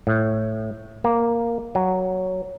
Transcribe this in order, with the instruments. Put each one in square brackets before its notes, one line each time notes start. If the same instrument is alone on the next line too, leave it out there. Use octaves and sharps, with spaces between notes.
[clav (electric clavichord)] A2
A#3
F#3